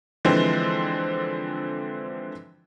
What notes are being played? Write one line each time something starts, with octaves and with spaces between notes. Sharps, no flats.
D3 E3 F3 G#3 C4